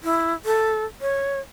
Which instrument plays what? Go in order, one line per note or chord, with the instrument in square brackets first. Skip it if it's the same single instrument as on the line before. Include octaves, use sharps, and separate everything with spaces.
[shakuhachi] E4
A4
C#5